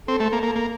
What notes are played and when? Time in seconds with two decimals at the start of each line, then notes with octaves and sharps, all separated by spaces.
0.08 C4 A4
0.20 A3
0.33 A#3
0.43 A#3
0.56 A#3